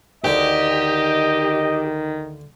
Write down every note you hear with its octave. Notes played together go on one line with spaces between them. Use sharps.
D2 D3 D#3 G4 D#5